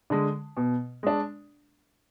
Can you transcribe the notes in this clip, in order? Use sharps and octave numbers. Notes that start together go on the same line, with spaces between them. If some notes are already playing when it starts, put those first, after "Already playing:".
D3 G#3
B2
G#3 D4